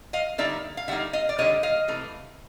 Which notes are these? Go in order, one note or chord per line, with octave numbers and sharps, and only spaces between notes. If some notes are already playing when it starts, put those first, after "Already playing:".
D#5 F5
D3 G3 A#3 D#4 D5 E5
F5
D3 G3 A#3 D#4 E5 F#5
D#5 F5
D5
D3 G3 A#3 D#4 C#5 D#5
D#5 F5
C3 E3 A3